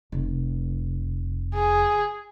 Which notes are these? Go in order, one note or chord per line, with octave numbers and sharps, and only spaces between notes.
F1
G#4